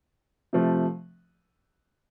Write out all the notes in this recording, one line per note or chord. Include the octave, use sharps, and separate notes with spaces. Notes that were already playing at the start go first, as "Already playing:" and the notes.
C3 F3 A3